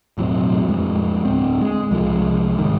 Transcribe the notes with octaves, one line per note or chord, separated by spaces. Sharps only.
E1 A2 F#3 C4
F2 G#3
D1 C4
G#3
C2 F3 G#3
G#2 D#3